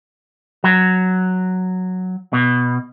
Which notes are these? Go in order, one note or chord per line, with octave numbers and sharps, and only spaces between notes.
F#3
B2